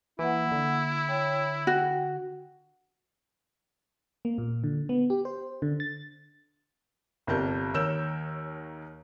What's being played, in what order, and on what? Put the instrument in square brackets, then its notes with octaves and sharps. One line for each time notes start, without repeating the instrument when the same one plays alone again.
[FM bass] E3 [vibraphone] A#3 F#5 [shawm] E4
[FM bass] D3
[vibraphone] C#5 G5
[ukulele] F#4 [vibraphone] G5
[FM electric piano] A#3
A#2
D3
B3
G4
C5
D3
A6
[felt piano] G1 C3 G3 A#4 A5 G6
D#2 A#4 C#5 E6 G6 E7